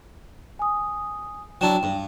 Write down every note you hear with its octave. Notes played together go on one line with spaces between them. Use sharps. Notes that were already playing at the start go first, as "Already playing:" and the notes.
G#5 D#6
F#3 D4 E4 G5 E7
G2